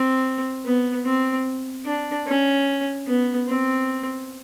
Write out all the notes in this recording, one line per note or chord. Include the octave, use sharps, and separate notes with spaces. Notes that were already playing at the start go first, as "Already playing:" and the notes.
Already playing: C4
B3
C4
D4
C#4
B3
C4